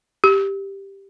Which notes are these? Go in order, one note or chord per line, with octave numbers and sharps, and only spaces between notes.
G4